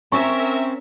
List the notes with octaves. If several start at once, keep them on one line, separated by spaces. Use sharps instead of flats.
C4 C#4 A#4 E5 C#6